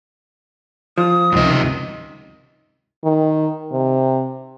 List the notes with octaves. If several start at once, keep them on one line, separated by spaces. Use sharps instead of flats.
F3 D#6
C#2 F#2 C3 D#3 D#5
D#3
C3